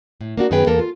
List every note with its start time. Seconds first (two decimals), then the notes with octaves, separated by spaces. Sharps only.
0.21 A2
0.37 A#3 D4 F#4
0.51 F#2 D#3 B3 G#4 B4 G5
0.66 E2 A#3 A4 A#4
0.79 F4